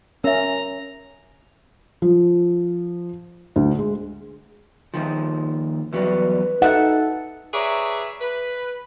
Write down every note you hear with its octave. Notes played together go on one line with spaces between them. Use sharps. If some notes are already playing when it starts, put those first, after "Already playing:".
C#4 A#4 E5 A#5
F3
D2
G#3
D#2 D#3 F3
E2 F#3 G3 B4
D#4 A4 E5 F#5
G#4 B4 C#5 D5 E5 A#5
B4